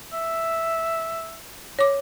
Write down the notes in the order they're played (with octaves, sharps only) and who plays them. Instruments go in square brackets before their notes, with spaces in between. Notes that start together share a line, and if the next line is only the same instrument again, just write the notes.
[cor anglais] E5
[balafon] C#5 D6